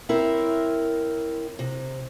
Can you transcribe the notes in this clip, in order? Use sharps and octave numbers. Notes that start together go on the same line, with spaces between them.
C4 E4 A#4 C#5
C3